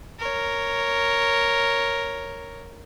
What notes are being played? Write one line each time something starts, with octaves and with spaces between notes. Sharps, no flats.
A#4 C#5